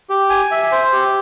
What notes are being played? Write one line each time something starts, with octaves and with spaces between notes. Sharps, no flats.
G4
G#5
E5
C5
G4